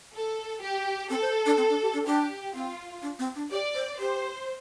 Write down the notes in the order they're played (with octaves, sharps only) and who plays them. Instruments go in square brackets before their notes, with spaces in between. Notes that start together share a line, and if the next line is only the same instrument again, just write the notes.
[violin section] A4
G4
[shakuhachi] C4 [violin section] A4
[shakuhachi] C5
D4
C4
D4
G4
D4
[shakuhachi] D4 [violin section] G4
[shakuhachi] C4 [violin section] F4
[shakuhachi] D4
C4
D4
[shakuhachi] G4 [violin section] D5
[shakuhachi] C5
[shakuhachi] G4 [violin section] C5